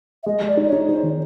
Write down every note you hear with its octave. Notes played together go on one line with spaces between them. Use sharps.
E5
G#3 D#5
G#3
D5
D#4
D5
C#5
D#4
D#4 C5
D#3